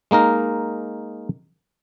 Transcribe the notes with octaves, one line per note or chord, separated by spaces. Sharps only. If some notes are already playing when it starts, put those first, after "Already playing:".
G#3 A#3 D#4 A#4